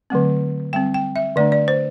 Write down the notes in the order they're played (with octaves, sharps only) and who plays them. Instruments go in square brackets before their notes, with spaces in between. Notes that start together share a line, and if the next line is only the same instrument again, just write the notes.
[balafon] D3 F#3 A3 C4
G3 C4 G5
G5
E5
D3 A3 D4 D5
D5
C5